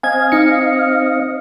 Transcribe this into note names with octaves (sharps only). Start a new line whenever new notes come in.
C4 D#5 F5 G#5 G#6
D#4 C#7